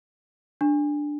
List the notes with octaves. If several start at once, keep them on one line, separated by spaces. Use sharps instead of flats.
D4